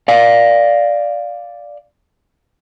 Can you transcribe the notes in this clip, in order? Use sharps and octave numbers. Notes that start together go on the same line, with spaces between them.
D5 F5